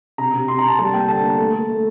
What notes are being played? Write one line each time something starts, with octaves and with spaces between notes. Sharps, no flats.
C3 A#5
C3
C3 C6
A#5
C3 A5
G3 A5
A#3 G5
D3 A5
A#3
A3
A3
A3